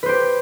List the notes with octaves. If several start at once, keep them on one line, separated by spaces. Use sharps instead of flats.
G4 B4 C5